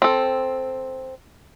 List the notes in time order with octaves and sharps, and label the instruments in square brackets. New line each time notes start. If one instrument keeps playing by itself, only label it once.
[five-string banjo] C4 A4